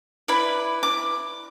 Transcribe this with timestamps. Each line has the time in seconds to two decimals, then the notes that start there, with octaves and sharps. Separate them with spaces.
0.28 E4 B4 D5 B5
0.83 D6